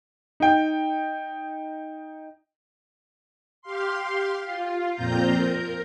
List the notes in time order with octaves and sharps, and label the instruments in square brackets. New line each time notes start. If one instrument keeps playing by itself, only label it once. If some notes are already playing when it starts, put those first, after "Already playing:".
[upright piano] D#4 G5
[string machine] G4 F5 C6
F4
F2 A#2 C4 F4 A#5 G6
A#4